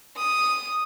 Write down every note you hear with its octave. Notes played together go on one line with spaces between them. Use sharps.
D#6